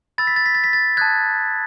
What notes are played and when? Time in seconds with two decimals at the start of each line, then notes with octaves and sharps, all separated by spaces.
0.18 B5 E6 A6
0.27 B6
0.36 A6
0.46 B6
0.55 A6
0.64 B6
0.73 A6
0.97 A5 D#6 F#6 G#6